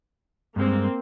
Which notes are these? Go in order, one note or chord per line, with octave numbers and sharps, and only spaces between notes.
G2 G#3 A#3 C4